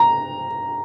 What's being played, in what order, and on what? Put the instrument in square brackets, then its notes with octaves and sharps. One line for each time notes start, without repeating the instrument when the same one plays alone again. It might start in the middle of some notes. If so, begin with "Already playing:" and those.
Already playing: [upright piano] A#5